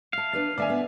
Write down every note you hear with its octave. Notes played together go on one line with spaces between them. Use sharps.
E5 F5 A5
D4 B4 D5
D3 A3 A#3 D5 E5 G#5
B3